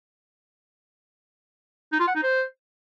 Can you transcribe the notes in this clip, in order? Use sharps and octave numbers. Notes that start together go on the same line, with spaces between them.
D#4
F4
F#5
D#4
C5